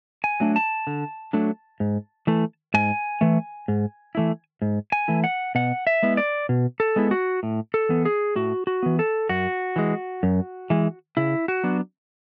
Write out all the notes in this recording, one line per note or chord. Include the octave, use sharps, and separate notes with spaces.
G#5
F#3 A3 D4
A5
D3
F#3 A3 D4
G#2
E3 A3
G#2 G#5
E3 A3
G#2
E3 A3 E4
G#2
G#5
E3 A3 E4
F#5
B2 F#5
E5
G#3 B3 E4
D5
B2
A4
G#3 B3 E4
F#4
A2
A4
E3 B3
G#4
A2 F#4
F#4
E3 B3
A4
F#2 F#4
E3 G#3
F#2
E3 G#3
C#3 E4
F#4
F#3 B3 D4